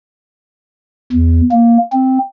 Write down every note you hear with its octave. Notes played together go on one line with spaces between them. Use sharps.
E2
A#3
C4